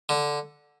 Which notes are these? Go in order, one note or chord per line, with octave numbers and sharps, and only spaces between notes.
D3